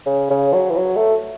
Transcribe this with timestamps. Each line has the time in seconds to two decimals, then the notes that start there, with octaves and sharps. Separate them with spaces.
0.06 C#3
0.30 C#3
0.54 F#3
0.71 E3
0.77 F#3
0.96 A3